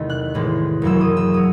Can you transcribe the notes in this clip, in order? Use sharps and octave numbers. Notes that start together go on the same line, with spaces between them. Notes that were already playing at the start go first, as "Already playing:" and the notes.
Already playing: E2 C3 D#3 A3
F#6
A1 A2 E3 G#3
F#1 F#2 E3 G#3 E6
D#6
E6
F#3 D#6